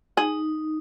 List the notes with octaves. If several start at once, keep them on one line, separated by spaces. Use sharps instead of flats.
D#4 G#4